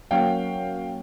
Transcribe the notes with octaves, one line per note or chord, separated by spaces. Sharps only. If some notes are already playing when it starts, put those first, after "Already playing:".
F#3 A#3 C#4 F#4 F5 G5